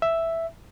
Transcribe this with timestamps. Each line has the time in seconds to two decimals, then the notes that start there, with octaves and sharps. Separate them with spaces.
0.02 E5